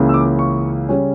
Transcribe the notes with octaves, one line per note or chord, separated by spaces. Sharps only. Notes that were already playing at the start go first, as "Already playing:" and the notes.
Already playing: C#2 C#3 E3 A#3
E6
D6
C#6
C#3 G3 C#4